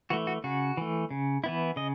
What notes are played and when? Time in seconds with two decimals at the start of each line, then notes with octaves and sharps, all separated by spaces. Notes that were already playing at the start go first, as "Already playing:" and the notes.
0.10 E3 A3 F#4
0.27 F#4
0.44 C#3 F#4
0.77 E3 A3
1.10 C#3
1.44 E3 B3 E4
1.76 C#3 D#5